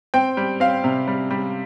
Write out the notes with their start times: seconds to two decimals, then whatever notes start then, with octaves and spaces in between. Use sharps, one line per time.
0.14 C4 G5
0.37 G3
0.60 C4 F5
0.84 C3
1.08 G3
1.31 G3